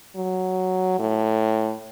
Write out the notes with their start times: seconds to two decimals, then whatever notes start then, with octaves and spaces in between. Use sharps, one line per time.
0.16 F#3
0.99 A2